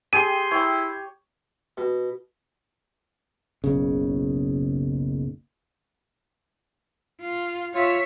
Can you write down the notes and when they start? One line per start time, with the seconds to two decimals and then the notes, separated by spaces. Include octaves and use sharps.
0.13 G4 G#4 G5 C6 D#7
0.51 E4 C#5 G5
1.77 B2
3.64 F#1 B1 C#3
7.21 F4
7.75 F4 C#5 E5